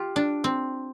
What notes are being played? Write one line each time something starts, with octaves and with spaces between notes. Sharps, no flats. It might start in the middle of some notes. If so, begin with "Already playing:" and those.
Already playing: F4 G4
D4
C4